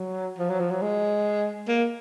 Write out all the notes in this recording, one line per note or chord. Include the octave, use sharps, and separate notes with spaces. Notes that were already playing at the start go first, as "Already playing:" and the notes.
Already playing: F#3
F3
F#3
F3
F#3
G#3
A#3